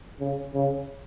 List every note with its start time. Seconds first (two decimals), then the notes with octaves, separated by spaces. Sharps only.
0.20 C#3
0.54 C#3